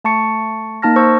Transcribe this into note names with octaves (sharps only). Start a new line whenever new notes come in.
A3 A5 C#6 C#7
A#3 D#4 A5 F6 A#6
C5 C#6 E6